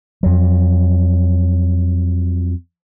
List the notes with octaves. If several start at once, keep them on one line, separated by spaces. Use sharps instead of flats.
F2 F#3